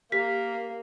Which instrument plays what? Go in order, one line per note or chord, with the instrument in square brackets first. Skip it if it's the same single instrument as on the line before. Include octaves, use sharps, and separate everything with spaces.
[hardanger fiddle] A#3 [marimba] G4 [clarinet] A#4 [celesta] B6